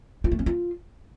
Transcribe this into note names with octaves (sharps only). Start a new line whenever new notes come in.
F4
A3
C#4
F4